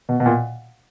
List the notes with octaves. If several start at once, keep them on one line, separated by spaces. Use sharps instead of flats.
B2
B2
A#2